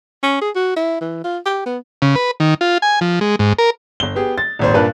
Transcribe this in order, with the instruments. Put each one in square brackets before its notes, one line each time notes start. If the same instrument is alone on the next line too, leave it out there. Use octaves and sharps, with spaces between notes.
[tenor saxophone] C#4
G#4
F#4
E4
E3
F4
G4
B3
[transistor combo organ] C#3
B4
D#3
F4
G#5
F3
G#3
G#2
A#4
[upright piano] G1 G7
B3 G4 G#4
A6
D#1 G#1 C5
G2 A#2 A#3 B4 A5 F#6